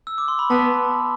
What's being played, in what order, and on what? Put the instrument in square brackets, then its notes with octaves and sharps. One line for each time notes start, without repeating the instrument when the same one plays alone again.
[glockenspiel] E6
D6
C6
B5
[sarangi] B3 [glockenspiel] A5